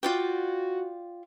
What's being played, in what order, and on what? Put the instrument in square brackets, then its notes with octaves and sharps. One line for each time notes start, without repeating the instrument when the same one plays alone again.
[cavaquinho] F4 D5 G5 [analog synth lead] F#4